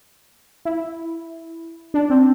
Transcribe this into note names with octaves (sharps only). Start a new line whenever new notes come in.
E4
D4
C4